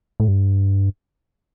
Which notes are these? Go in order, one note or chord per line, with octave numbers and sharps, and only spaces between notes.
A2
G2